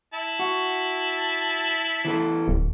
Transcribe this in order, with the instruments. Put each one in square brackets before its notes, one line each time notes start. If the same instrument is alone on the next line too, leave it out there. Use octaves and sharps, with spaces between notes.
[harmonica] E4 A5
[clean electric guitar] F#4
E3 B3 A4
[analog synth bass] D1